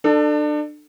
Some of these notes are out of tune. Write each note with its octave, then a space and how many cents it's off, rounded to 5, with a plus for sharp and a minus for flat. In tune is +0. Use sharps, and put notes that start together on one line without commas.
D4 +30 A4 +10